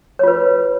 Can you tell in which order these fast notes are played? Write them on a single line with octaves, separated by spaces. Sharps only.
C#5 F4 B4